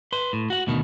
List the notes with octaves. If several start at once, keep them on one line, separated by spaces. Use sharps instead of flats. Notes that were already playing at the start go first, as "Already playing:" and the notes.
B4 C6
A2
F#4 F#5
D2 B2 D#3